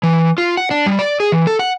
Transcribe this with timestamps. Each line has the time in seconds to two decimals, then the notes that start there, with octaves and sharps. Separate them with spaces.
0.03 E3
0.38 F4
0.57 F#5
0.71 D4
0.86 G3
0.99 D5
1.20 G#4
1.32 E3
1.47 A4
1.59 F#5